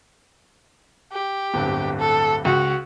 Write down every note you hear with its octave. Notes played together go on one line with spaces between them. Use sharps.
G4
D1 G1 G2
A4
C#2 F#4